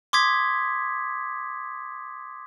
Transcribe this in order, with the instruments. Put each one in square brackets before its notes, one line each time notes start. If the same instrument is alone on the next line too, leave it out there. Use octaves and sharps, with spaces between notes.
[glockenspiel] C6 D6 D#6 G#6 B6